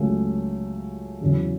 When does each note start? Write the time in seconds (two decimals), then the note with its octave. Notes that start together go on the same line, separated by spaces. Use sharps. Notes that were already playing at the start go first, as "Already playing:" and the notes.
Already playing: C#2 C#3 F#3 A3
1.21 E2 C#3 F#3